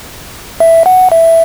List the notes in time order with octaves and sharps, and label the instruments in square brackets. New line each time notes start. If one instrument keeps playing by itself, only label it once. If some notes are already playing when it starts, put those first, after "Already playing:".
[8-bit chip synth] E5
F#5
E5